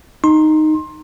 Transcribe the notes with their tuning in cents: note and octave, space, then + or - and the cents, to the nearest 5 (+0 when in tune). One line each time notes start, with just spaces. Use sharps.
D#4 -5 C6 +20